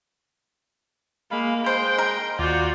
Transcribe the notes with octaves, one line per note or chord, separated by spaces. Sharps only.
G#3 A#3 F5 B5
G#3 C5 G5 C6
A#4
D#2 F4 F#4 D5 G6